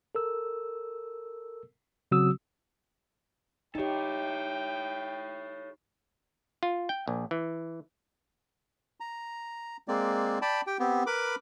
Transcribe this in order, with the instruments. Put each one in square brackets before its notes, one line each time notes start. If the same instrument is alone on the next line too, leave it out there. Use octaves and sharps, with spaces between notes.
[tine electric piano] A4 A#4 E6
C#3 F#3 C4 F#4 D#6 E6
[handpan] D#4 G4 [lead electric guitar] A4 C#5 [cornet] G5
[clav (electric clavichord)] F4
G5
A#1
E3
[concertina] A#5
G#3 A#3 C4 D5
D5 G5 A5 B5
G4 G5
B3 C4 G4
A#4 B4 B5 D6